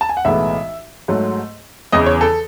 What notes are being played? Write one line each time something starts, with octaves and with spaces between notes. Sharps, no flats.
A5
G#5
F#5
B1 A2 E3 G#3 B3 E5
G#2 F#3 A3
E2 C#3 E3 D#5
C#5
A4